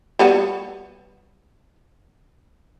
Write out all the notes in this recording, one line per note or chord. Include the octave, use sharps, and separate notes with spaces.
G3 B3 F#4